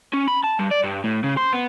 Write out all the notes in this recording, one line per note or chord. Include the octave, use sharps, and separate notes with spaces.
C#4
B5
A5
G2
D5
G2
A2
C#3
C5
B3